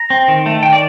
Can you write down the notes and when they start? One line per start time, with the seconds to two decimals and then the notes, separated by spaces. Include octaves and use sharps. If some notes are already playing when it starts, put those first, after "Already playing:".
Already playing: A#5
0.10 C4
0.28 D#3
0.46 A3
0.63 D#3 G5
0.73 D5